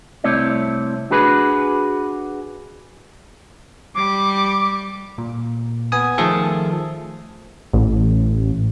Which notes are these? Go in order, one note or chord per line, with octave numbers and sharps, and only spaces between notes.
C2 A3 C4 E4 C#5 D5
D4 F#4 G#4 B4
G3 D6
A#2
B3 G#5 D#6
D#3 F3 A3 G#4 A4
A1